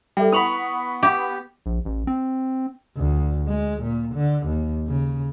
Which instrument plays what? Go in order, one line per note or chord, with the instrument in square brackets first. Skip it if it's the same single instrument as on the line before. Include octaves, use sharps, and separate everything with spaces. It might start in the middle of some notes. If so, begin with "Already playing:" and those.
[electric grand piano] G3 [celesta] A4 E5 G5
[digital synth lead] B3 [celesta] E4 F7 F#7 [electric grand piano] B5 C#6 D#6
[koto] G4
[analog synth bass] A#1
A1
C4
[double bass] D2
G#3
A#2
D3
D#2
C#3